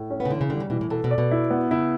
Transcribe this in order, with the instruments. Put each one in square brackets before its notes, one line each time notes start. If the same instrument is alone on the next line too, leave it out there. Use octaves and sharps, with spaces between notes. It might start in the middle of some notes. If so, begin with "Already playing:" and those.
Already playing: [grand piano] A2
C#4
[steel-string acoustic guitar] B3
C#3
[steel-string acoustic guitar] D3 [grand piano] E3
[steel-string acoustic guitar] C#3
[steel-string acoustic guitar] D3 [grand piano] G3
[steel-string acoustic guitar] C#3
[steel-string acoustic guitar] B2 [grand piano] E3
[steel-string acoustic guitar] A2
[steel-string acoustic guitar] B2 [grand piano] A4
[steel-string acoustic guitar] B2
[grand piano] D5
[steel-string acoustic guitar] B2
[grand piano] E4
B3
[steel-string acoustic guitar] C#3 [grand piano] E4